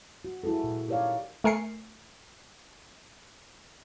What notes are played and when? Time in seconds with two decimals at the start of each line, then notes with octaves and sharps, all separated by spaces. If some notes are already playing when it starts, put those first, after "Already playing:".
0.25 F#4
0.44 E4 F#4 G#4 A4
0.64 A#2
0.88 D#4 G4 A#4 C#5 D5 F5
1.44 A3 A#4 G#5 C7 C#7